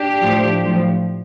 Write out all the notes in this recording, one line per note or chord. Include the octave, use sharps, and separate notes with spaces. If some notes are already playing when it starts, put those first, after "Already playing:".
Already playing: D4 G4
A2 F3
A2 F3